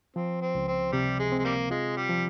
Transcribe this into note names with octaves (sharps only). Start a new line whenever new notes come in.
F3 C4
C4
C#2
C4
C3 G3
G#3
C4
G#3
G3 A#3
G#3 F4
G3
F3